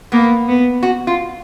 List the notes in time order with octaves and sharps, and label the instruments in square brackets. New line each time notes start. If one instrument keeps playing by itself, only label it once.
[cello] A#3 [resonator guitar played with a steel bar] B3
[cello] B3
[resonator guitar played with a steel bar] F#4
F4